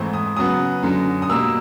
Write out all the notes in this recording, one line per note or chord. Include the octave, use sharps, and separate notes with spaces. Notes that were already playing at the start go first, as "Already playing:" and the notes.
Already playing: G#2 E3 A3 C4
D#6
C#3 F#3 B3 D#6
F#2 D3 F#3
D#6
B2 G3 A#3 E6